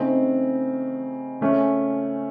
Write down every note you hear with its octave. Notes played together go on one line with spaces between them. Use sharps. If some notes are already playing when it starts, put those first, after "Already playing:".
Already playing: C#3 A3 C4 D#4
C#3 A3 C#4